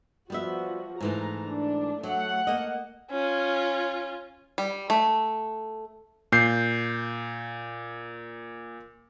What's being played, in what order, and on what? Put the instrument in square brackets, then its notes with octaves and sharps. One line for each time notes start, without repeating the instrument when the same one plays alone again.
[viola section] F3 F#4 [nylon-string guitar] G3 B3 E5
[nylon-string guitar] G#2 E3 A3 [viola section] A#5
[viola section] D4
[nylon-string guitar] F#3 [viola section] A3 F#5
[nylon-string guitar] A#3 D#5
[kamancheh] C#4 F4
[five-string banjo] G3
A3
[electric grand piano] A#2 G6 C7